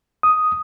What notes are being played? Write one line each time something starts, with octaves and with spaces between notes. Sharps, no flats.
D#6